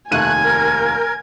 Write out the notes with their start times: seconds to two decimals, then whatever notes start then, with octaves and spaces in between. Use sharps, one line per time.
0.12 F1 D#2 A3 G#5 F#6 G#6 D#7
0.44 A#4